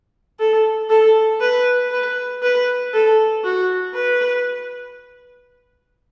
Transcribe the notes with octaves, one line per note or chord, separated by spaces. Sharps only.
A4
A4
B4
B4
B4
A4
F#4
B4